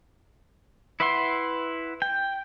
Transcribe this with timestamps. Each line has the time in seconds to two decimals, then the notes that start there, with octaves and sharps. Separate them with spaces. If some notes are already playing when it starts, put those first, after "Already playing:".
1.00 E4 B4 E5 F#5 C6
2.02 G5